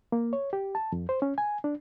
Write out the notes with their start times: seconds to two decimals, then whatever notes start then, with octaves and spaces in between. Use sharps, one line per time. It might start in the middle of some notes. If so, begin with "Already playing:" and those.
0.12 A#3
0.33 C#5
0.53 G4
0.75 A5
0.92 F2
1.09 C5
1.22 C#4
1.38 G#5
1.64 D4